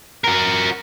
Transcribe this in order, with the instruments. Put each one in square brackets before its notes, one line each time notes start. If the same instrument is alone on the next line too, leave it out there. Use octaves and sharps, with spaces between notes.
[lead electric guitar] F#4 A#4